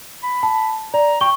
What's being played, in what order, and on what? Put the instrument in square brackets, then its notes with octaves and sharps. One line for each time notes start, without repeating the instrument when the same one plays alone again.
[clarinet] B5
[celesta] A5
[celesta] D5 [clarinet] A#5
[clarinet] G5 [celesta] C#6 G7